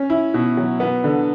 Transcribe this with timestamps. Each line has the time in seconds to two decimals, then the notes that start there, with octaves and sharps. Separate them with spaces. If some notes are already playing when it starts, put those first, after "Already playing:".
Already playing: C#4
0.10 E4
0.34 B2
0.57 F#3
0.80 B3
1.04 D3